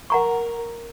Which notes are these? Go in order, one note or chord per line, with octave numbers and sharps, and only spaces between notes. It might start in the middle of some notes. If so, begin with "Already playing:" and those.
A#4 F#5 A#5 C#6